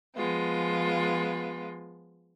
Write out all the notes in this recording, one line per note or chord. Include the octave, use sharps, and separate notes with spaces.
F3 G#3 B3 F4